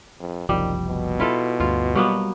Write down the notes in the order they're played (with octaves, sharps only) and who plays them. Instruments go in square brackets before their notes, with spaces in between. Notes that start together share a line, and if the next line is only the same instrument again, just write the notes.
[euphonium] F2
[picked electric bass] F#1 C2 F3 [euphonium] D#3 [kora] G3
[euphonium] B2
[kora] E4 F4 A4
[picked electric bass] D2 G2 [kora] F4
[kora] F#3 A#3 B3 [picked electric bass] G3